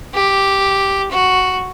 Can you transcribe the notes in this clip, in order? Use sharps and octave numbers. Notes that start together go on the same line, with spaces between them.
G4
F#4